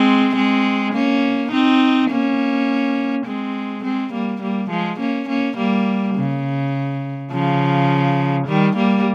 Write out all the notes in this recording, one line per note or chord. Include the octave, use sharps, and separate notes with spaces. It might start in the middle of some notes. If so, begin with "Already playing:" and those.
Already playing: G#3 C4
G#3 C4
A#3 C#4
C4 D#4
A#3 C#4
G#3 C4
G#3 C4
G3 A#3
G3 A#3
F3 G#3
A#3 C#4
A#3 C#4
G3 A#3
C#3
C#3 F3
D#3 G3
G3 A#3